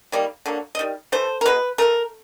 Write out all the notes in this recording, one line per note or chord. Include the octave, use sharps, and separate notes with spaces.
D#3 G3 A#3
D3 F#3 A#3
D#5
D#3 G3
E3 A3 C5
A#4
B2 G#3 B3 B4
E3 A3 A#4